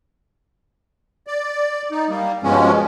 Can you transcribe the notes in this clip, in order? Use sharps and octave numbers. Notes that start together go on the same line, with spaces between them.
D5
D#4
G3 A#3
G2 B2 F3 G#3 C#4